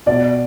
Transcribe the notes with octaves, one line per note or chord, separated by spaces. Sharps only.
B2 D5